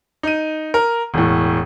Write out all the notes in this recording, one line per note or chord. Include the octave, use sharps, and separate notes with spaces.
D#4 D#7
A#4
E1 A2